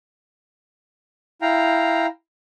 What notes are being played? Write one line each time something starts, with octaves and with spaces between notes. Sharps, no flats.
E4 F5 G5 A#5